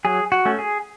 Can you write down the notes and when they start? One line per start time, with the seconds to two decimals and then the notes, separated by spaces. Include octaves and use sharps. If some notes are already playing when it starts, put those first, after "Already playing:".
0.05 F#3 G#4
0.32 F#4
0.45 A3 C#4
0.58 G#4